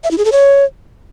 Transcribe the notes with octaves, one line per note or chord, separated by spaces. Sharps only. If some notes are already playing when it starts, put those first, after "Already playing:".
E5
E4
G#4
A4
C#5